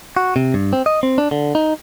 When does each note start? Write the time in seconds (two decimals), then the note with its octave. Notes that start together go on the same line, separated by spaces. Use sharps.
0.17 F#4
0.36 C3
0.54 G2
0.73 C4
0.86 D#5
1.03 C4
1.18 D4
1.31 D3
1.55 D#4